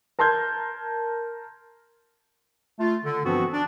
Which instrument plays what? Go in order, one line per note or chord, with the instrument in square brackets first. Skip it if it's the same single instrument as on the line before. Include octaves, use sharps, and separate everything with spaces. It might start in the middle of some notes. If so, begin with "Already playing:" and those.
[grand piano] A#4 A5 C6 F6 G6 G#6
[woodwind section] A3 F4
D3
G2 E3 F3 B3 C4 F#4
D4